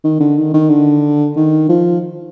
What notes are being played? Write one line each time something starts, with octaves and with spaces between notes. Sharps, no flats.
D#3
D3
D#3
D#3
D3
D#3
F3